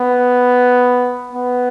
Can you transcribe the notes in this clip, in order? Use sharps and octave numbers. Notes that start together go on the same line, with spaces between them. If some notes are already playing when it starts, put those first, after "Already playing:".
Already playing: B3
B3